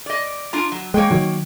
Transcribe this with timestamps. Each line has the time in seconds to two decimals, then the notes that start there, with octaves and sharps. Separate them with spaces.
0.06 D5 D#5
0.53 D4 F4 A#5
0.72 F#3
0.94 G#3 A#3 C#5 G5
1.11 D#3 F#3